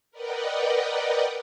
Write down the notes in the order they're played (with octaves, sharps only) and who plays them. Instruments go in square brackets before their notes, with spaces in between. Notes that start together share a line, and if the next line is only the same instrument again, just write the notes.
[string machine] A#4 B4 D5 D#5 F#5 G5